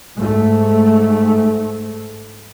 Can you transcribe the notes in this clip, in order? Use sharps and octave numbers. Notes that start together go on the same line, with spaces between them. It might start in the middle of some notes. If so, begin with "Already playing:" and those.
G#2 A3